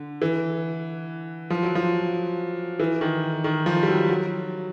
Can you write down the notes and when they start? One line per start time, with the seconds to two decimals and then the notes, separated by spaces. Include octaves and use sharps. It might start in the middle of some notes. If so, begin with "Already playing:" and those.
Already playing: D3
0.22 E3
1.50 F3
1.63 F#3
1.75 F3
2.79 E3
3.01 D#3
3.44 D#3
3.66 F3
3.83 G3
3.88 F#3
4.09 F#3